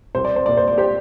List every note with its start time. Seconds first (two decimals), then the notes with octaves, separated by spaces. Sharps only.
0.15 C2 C5
0.25 D5
0.36 C5
0.46 A#2 D5
0.57 C5
0.68 D5
0.78 G4 C5